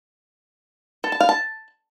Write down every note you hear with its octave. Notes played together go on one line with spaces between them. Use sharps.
A4
A5
F5
A5